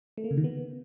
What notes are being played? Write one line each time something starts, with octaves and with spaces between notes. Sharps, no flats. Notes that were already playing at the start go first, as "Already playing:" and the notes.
A3
A#3
C#3
D#3
B3